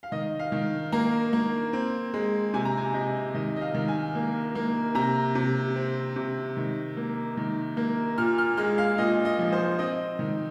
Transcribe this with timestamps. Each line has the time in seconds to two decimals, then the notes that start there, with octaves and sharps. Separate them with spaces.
0.03 F5
0.12 D#3 D#5
0.39 F5
0.52 D#3
0.92 A#3 A#5
1.33 A#3
1.73 C4
2.14 G#3
2.54 C3 G#5
2.65 A#5
2.77 G#5
2.94 C3 D#5
3.34 D#3 D#5
3.56 D#5
3.61 F5
3.74 D#3
3.88 G#5
4.15 A#3
4.55 A#3
4.95 C3 A#5
5.35 C3
5.76 C4
6.16 C3
6.57 D#3
6.97 A#3
7.37 D#3
7.77 A#3
8.18 A#2 F6
8.38 F6
8.57 G#3 F6
8.78 F5
8.98 A#2 D#5
9.25 D#5
9.39 F3
9.52 C5
9.79 C4 D#5
10.19 D#3